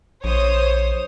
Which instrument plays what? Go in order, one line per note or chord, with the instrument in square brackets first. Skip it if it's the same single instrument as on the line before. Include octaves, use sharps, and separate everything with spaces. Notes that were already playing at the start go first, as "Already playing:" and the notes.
[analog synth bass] A#1 [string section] C5 C#5 D#6